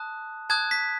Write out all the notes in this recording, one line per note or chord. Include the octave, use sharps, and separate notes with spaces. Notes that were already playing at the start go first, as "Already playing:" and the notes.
Already playing: A5 D#6 F#6
A5 D#6 F#6 G#6
B6